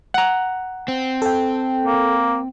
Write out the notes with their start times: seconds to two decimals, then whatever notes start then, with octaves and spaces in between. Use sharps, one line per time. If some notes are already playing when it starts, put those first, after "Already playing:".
0.14 F#5 A#5
0.88 C4
1.22 A4 G5
1.85 A#3